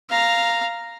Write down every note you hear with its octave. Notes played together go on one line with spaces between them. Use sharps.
F5 A#5